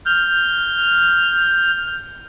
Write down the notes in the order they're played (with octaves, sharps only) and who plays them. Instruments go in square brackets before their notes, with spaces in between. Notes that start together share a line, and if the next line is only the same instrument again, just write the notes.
[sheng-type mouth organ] F6 G6